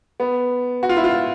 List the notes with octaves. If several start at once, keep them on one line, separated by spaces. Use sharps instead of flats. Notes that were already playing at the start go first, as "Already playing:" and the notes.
B3
F#4
F4
E4
F4